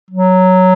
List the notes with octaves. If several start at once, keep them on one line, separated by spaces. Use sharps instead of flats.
F#3